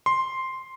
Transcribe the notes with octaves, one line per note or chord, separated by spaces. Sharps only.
C6